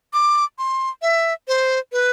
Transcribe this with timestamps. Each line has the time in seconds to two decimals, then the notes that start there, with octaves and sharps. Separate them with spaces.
0.13 D6
0.59 C6
1.02 E5
1.48 C5
1.92 B4